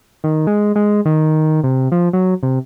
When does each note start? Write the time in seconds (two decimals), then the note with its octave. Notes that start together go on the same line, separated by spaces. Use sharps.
0.24 D#3
0.47 G#3
0.75 G#3
1.05 D#3
1.64 C3
1.92 F3
2.13 F#3
2.43 C3